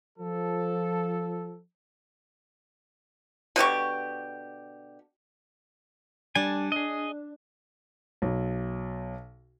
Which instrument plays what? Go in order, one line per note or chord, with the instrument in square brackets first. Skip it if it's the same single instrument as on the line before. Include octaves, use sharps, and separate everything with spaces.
[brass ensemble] F3 A4
[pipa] B2 D3 G4 C#6
[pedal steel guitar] G3 G#5 [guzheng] D4
[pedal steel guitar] G#4 D#5
[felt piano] B1